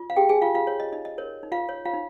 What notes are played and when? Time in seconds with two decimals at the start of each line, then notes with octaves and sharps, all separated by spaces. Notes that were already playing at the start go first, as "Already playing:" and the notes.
Already playing: F4
0.10 F5
0.16 G4 G#4 G5
0.29 G#4 G#5
0.42 F4 F5
0.55 F4 F5
0.67 C#5
0.80 D#5
0.92 D#4 D#5
1.05 D#5
1.18 A#4 C#5
1.43 D#4
1.52 F4 F5
1.69 C#5
1.85 F4 F5
1.94 D#4